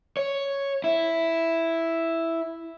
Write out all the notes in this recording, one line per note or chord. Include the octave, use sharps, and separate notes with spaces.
C#5
E4